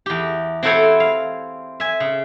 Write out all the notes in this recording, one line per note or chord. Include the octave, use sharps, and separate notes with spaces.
E2 G4
C4 E4 F#4 A4 C5 C#5
F5
E5 G#5
C#3